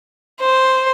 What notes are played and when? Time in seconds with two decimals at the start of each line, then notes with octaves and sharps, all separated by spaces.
0.40 C5